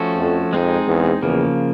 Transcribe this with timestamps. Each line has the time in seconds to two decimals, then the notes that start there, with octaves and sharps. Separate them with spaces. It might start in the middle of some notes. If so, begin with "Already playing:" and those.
Already playing: F3 A3 C#4 F#4 A4
0.18 F2
0.53 F2 G#3 C4 D#4 G#4
0.87 E2
1.22 E2 C#3 F3 A#3